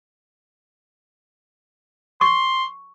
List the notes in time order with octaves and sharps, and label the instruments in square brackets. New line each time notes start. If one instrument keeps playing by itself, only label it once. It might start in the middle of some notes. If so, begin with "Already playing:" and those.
[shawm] C6 [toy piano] C#6